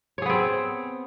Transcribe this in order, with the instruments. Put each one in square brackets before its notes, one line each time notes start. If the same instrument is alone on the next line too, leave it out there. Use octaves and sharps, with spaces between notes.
[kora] C#5
G#4
B3
C4